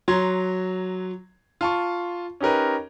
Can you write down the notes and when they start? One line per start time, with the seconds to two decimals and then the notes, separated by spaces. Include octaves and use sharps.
0.08 F#3 A#5 C6 G#6
1.61 F4 A5 C#6
2.40 C#4 D#4 G4 A#4 B4